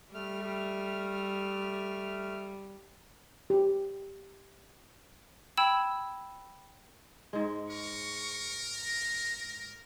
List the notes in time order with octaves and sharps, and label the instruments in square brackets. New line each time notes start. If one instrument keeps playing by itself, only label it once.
[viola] G3 [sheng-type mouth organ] A3 F6
[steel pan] G4
[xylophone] G5 B5 E6 G#6 E7
[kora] G#2 G#3
[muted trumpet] A#4 [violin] C#6
[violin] A#6